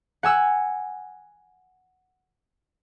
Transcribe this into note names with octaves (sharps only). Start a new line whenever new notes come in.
F#5 G#5 E6